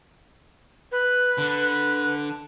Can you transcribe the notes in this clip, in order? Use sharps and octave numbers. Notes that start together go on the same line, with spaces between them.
B4
D3